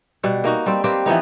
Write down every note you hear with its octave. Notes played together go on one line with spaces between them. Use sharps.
B2 G3 F#5
A#3 D#4 F#4
G3 C4
A#3 C4 G4 B4
E3 F3 B3 D#4